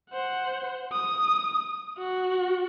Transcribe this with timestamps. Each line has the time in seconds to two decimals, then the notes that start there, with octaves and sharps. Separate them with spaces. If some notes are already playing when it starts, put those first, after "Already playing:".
0.11 C5 F#5
0.92 D#6
1.98 F#4